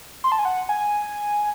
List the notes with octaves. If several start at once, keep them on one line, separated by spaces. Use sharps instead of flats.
C6
A5
G#5
F#5
G#5